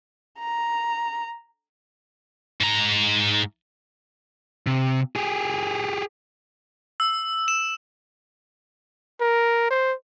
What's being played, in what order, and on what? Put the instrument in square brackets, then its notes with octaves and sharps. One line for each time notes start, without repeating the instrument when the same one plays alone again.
[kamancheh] A#5
[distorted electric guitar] G#2 A#5
[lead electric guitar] C3
G4 G#4
[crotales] E6
E7
[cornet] A#4
C5